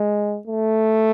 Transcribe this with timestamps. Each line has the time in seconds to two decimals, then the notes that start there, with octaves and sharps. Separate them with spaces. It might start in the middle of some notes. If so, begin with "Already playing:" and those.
Already playing: G#3
0.47 A3